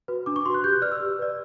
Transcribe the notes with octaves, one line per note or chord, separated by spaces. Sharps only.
F#4 B4
D4 D6
C#6
F#4 B4 C6 F#6
G4 G6
F#6
B4 D5 F6
E6
G4
B4 D5